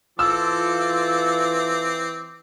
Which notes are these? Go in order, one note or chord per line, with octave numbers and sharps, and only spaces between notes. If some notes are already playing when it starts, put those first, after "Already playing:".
E3 C4 F4 A4 D6 E6